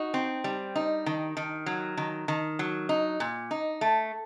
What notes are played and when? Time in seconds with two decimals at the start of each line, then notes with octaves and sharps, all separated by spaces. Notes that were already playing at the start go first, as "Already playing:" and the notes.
Already playing: D#4 F#4
0.14 C4
0.44 G3
0.76 D#4
1.06 D#3
1.37 D#3
1.66 F#3
1.97 D#3
2.28 D#3
2.59 F#3
2.89 D#4
3.20 A#2
3.51 D#4
3.81 A3